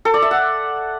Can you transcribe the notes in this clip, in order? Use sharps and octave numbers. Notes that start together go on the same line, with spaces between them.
A4
D5
E5
F#5